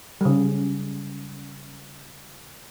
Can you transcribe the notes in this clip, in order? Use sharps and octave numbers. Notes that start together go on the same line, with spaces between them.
C#3 G3